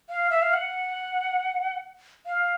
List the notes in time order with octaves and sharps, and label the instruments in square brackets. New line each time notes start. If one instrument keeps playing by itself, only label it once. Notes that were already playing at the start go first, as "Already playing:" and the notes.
[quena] F5
E5
F5
F#5
F5